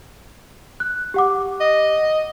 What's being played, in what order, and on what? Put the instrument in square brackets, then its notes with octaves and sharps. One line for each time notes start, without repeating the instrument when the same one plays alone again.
[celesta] F#6
G4 F#5 D6
[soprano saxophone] D#5